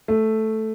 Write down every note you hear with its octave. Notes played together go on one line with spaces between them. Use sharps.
A3